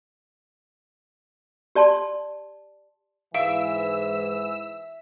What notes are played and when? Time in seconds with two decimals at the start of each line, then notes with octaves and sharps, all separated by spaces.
1.75 G4 D5 A5 C6
3.34 G#2 E3 E5 F5 E6 D7